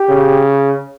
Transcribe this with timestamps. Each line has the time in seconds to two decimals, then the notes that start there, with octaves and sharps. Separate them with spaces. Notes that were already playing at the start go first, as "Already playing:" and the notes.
Already playing: G4
0.09 C#3